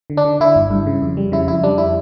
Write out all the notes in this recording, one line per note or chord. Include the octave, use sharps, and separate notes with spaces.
D3
D4
D3
D3 E4
G1
G2
C#3
F2
G3
C#3 E4
F2 E4
G3 D4
E4